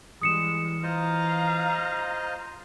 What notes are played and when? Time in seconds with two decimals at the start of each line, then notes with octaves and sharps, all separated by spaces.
0.21 E3 G3 G#3 D#6 C#7 E7
0.83 F4 C5 D#5 F5 A#5